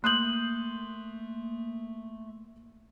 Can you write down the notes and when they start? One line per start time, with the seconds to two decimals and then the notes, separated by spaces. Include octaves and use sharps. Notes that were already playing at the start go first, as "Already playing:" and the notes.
0.04 A3 A#3 C6 D#6 F#6 G6 F#7